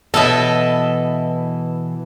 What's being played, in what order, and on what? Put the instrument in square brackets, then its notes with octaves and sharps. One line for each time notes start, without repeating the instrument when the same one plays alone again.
[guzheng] B2 E5 [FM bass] E3 [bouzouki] E4 A4 [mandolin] D#5 A5